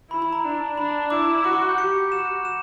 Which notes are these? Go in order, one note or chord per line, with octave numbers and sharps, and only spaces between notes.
E4 B5
B5
A#5
D4
D4 B5
E4 D6
F#4 D6
C#6
D6
G6
G4 C#7
F#4 E7
E7